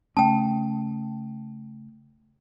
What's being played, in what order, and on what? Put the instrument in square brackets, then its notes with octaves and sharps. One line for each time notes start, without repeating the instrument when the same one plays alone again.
[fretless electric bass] C#3 A3 C#4 [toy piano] G5 A5